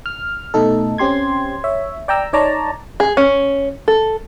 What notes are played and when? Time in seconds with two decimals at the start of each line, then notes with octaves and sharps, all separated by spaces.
0.06 F6
0.54 B2 A3 D#4 A4
0.98 C4 C#4 G4 C6 G#6
1.64 C#5 E5
2.08 D5 G5 A#5 E6
2.33 D#4 C#5 D5 A5 A#5
3.00 G#4
3.17 C#4
3.88 A4